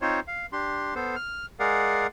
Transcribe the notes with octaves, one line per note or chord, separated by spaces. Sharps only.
C4 D#4 F4 C5 C#5
F5
D4 G4 C6
B3 A4 C5
F6
G#3 G#4 A#4 D5 F5 F#5